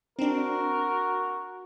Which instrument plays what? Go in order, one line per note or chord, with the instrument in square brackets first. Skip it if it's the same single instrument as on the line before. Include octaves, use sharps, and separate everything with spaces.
[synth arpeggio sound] C4 D4 [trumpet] F#4 [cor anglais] A#4